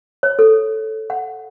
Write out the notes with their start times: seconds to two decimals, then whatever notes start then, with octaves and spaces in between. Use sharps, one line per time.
0.23 C#5
0.39 A4
1.10 F#5